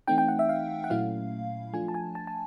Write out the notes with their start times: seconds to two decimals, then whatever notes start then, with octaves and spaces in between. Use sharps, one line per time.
0.08 E3 A3 C4 D#4 G5
0.18 G5
0.28 F#5
0.39 E5
0.49 F5
0.84 F#5
0.90 A#2 F#3 A3 C#4 E4 F5
1.73 F3 A3 D4 F4 G#5
1.88 A5
1.94 G#5
2.15 A5
2.27 A5